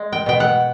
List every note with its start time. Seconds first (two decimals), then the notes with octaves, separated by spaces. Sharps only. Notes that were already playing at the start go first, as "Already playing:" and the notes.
Already playing: G#3
0.12 G5
0.26 B2 G5
0.40 F#5